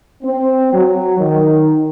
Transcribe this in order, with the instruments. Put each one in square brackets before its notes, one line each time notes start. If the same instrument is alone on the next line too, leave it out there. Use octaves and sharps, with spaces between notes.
[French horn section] C4
F#3
D#3